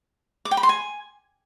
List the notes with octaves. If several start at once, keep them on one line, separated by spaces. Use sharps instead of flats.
D6
G5
B5
C6
G#5